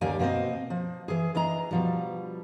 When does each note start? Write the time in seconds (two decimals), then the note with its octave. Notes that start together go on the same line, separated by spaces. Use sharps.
0.01 D#2 D3 A#3 G4 D5 G#5
0.19 B2 A#3 C4 C5 D#5
0.70 F3
1.08 E3 G#4
1.35 E3 D4 D#5 A#5
1.71 B2 F3 G3